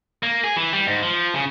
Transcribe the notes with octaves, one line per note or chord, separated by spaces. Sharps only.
A#3
G#4
E3
G3
G#2
F3
C#3